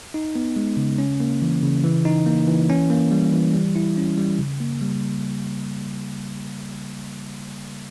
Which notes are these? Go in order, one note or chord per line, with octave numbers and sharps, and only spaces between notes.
D#4
B3
G#3
C#3
C#4
A#3
E3
C#3
E3
D#4
A#3
E3
C#4
A#3
G3
E3
G3
E4
C#4
G3
C#3
A#3
G3